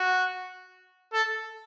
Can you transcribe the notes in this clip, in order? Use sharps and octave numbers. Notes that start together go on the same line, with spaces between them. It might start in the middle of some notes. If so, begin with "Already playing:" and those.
Already playing: F#4
A4